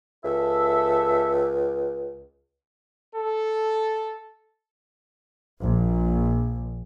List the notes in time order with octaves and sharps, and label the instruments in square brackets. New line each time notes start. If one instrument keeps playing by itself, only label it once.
[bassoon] C#2 [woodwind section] A4 E5
[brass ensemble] A4
[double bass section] A#1